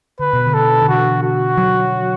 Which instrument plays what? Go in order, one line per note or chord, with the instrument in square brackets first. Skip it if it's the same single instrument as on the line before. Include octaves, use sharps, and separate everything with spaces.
[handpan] D3 [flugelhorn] B4
[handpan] B2
D3
[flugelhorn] A4
[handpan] D3
[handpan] E3 [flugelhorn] F#4
[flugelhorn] F#4
[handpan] F#3